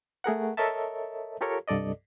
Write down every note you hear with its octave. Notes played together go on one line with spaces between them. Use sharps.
A3 G#4 A#4 F#5
A4 A#4 C#5 D#5 E5 A5
F4 G4 A4 A#4 C#5
C2 G2 A4 D5 D#5